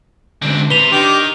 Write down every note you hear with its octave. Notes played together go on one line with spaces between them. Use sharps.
D2 D3 G#3 C4 D4
C3 B4 F7 G7
D#3 D4 G4 D6 G6